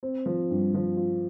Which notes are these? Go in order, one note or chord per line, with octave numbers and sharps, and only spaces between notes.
C4
F3
G2
F3
F4